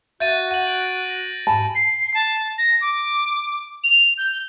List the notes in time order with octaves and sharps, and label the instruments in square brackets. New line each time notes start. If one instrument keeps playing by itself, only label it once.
[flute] F#4 [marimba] E5 F5 [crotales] G6 A6 D#7
[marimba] F#5 [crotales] D#7 F#7
[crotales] D7
A#6
[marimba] G#2 G#5 B5 [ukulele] A5
[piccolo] C7
A5
A#6
D6
F7
G6